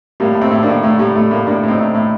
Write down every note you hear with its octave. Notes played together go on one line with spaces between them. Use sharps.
A2 G3 A#3
A2
A3 C4
A2
A#3 D4
A2
A2 A3
A2 G3
A2 A3
A2 G3 A#3
A2 A#3 D4
A2 C4 D#4
A2
A2